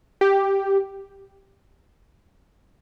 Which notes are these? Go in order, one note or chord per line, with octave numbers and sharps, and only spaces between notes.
G4